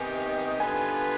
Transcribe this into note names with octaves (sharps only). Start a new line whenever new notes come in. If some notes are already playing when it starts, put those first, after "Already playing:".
Already playing: C3 D#3 B3 D#4 G4 G#5
D3 G3 B3 F4 B4 G#5